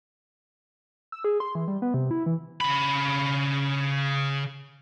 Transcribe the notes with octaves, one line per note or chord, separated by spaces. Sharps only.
E6
G#4
C6
E3
G3
B3
C3
E4
E3
C#3 B5